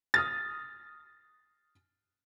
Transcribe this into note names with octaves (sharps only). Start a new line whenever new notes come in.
D#6 F6 A6